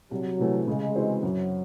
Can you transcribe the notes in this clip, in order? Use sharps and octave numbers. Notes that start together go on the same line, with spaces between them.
C2 F#3
C3 E3 A3
C#3 G#3
E3 C4 F#4 C5
F#2 F#3